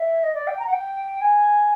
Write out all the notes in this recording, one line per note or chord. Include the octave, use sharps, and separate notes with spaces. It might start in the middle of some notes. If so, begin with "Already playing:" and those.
Already playing: E5
D#5
D5
G5
A#5
F#5
G5
G#5